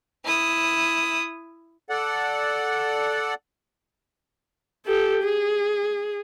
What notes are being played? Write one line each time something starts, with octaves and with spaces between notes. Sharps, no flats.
E4 D#6
A4 D5 F#5
G4 A4
G#4